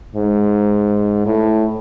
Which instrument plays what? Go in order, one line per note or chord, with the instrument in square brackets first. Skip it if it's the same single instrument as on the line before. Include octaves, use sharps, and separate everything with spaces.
[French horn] G#2
A2